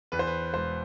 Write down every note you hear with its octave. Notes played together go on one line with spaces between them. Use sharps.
E2 B4
C5
B4
E1 C5